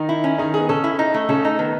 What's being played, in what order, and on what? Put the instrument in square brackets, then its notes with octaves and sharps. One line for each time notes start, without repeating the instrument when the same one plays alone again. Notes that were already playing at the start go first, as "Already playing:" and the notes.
Already playing: [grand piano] D#3 D#4
[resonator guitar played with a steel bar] E4
C#4
[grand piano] D#3 D#4 [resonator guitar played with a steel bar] G#4
[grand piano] B3 [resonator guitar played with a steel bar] G#4
[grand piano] C#3 C#4 [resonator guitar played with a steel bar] A4
[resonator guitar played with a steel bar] E4
D#4
A3
[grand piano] C#3 C#4 [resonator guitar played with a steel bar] A4
[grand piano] A3 [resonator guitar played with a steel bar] D#4
[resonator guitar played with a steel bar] D#3 [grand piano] B3